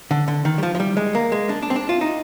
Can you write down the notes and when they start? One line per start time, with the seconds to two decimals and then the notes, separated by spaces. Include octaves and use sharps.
0.11 D3
0.28 D3
0.45 D#3
0.58 G3
0.63 F3
0.75 F3
0.80 G3
0.97 G#3
1.15 A#3
1.32 G#3
1.49 D4
1.63 D4
1.70 C4
1.76 D4
1.89 F4
2.01 D#4